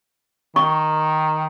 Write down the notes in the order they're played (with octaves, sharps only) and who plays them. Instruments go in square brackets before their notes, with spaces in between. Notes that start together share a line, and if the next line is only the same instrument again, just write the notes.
[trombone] D#3 [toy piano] C#6